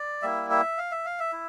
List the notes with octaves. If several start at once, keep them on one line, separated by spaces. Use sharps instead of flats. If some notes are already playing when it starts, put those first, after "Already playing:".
Already playing: D5
G3 A#3 E4 E5
E5
F5
E5
F5
E5
E4